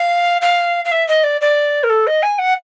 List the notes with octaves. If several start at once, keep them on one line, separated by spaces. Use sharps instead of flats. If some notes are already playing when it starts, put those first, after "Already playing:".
Already playing: F5
F5
F5
E5
D#5
D5
D5
A#4
A4
D#5
G#5
F#5